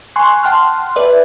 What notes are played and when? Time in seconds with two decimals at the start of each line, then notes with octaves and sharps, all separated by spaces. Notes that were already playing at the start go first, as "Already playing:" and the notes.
0.16 G#5 C6 C#6 F#6
0.43 F#5 G5 A5 C6 F6 F#6
0.96 B4 D5 E5